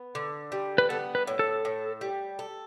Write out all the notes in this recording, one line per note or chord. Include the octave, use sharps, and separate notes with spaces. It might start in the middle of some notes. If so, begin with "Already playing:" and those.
Already playing: B3
D3
G3
B4
B3 A4
B4
A2
A4
A2
G3
A4